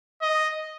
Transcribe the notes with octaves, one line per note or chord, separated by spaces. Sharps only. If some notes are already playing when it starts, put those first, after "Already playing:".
D#5